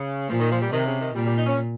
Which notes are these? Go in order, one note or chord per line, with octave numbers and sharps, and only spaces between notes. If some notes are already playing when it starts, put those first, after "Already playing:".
Already playing: C#3
A#2 F3
D#3
F3
G3
C3 D#3
C#3
D#3
A#2 G3
G3
D#4
C#4